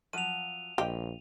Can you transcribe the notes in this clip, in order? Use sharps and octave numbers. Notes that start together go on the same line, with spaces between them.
F3 F#3 D#7 F7
A#1 G4 D#5 F5